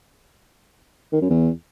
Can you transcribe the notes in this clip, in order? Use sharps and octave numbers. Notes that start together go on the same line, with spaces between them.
D#3
F#2
E2